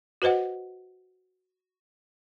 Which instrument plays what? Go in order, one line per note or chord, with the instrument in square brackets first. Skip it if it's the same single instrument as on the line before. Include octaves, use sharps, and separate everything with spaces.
[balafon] F#4 B4 C5 D#5 F#5